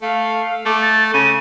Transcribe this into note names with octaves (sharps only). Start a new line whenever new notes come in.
A3 F5
A3 D6
A6
C#3 D#7